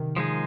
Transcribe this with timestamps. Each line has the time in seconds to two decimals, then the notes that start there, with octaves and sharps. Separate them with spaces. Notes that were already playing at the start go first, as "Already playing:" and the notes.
Already playing: C3 D#3
0.17 F3 G#3 D#4 G#4